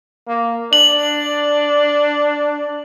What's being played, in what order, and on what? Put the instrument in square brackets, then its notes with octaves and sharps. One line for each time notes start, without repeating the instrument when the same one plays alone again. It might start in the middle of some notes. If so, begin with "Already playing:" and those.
[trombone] A#3
[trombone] D4 [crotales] F#7